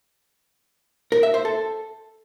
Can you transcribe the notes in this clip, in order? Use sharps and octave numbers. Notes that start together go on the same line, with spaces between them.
A#4
E5
C5
A4